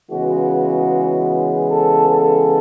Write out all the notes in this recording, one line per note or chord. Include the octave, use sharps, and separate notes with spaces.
C#3 E3 G#3 B3 F#4
A4
A4